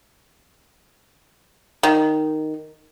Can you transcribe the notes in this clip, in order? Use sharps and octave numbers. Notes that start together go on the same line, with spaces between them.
D#3